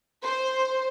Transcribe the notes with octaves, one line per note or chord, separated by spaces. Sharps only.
C5